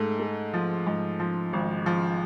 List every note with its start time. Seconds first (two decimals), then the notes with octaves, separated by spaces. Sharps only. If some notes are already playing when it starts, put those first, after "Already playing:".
Already playing: G#2 A3
0.20 A3
0.54 F3
0.87 G#2
1.20 F3
1.53 G#1
1.86 F3